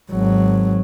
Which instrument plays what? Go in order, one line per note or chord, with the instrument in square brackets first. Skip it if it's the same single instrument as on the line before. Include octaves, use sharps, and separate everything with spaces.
[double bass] G#1 F#3